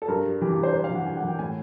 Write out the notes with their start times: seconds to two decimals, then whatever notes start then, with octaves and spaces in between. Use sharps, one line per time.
0.02 A4
0.08 G2 A#4
0.25 G3
0.41 E3 G4
0.52 G4
0.57 G2
0.63 C5
0.74 G2 C5
0.84 F5
0.91 E3 F#5
1.06 G2 G#5
1.17 F#5
1.22 E3
1.29 G5
1.39 A2 G#5